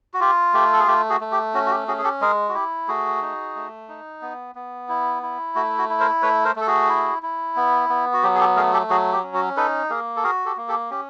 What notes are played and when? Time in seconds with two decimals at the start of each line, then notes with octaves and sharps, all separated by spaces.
0.14 F#4
0.20 F4 G4
0.54 A3 G4
0.73 A4
0.80 G#4
0.87 A3 G4
1.10 F#4 G#4
1.21 A3
1.32 G4
1.54 C#4 F#4
1.67 F#4
1.71 G4
1.88 C#4 F#4 G#4
1.98 G#4
2.04 G4 A4
2.21 G#3 G#4 A#4
2.49 F#4
2.54 E4 G4
2.88 A3 F#4 G#4
3.22 D#4
3.56 A3
3.89 D#4
4.22 B3
4.55 B3
4.89 E4
5.23 E4
5.55 A3 F#4
5.78 F#4
5.89 E4
6.00 A#4 C5
6.22 A3 B4 C#5
6.45 A#4 C5
6.56 A3
6.61 A4
6.67 F#4 G#4
6.89 E4
7.23 E4
7.56 B3
7.89 B3
8.14 F#4
8.23 F#3 G4
8.35 G#4
8.40 G4 A4
8.56 A3 G#4 A#4
8.73 G4 A4
8.90 F#3 F#4 G#4
9.12 G4
9.23 C#4
9.34 F#4
9.56 D#4 A4 B4
9.90 A#3 G#4 A#4
10.17 A4
10.24 F#4 G#4 A#4
10.46 G4 A4
10.57 A#3
10.68 G4 A4
10.91 C#4 G4